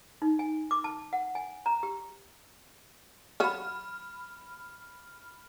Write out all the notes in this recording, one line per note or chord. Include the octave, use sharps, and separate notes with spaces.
D#4
G#5
D6
A5
F#5
G#5
A#5
G4
F#3 F#4 B5 F6